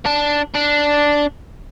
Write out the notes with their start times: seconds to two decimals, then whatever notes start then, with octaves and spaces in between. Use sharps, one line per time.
0.06 D4
0.55 D4